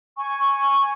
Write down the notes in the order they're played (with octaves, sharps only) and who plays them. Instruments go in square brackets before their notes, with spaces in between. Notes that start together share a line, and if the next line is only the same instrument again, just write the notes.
[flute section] G#5 C#6